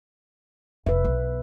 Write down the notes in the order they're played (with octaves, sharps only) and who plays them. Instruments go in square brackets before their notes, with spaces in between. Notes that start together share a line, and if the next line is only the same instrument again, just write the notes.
[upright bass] F1 [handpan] B4 E5
[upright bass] B1 B3